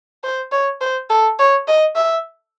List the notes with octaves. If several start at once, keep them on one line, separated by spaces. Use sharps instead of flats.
C5
C#5
C5
A4
C#5
D#5
E5